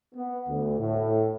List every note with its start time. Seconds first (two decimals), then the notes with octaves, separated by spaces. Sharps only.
0.15 B3
0.48 D2
0.80 A2